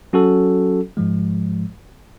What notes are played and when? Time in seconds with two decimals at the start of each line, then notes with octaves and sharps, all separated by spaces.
0.13 F#3 C#4 F#4 A4
0.97 G#2 F3 G#3